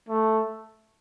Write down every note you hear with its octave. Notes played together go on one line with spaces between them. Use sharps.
A3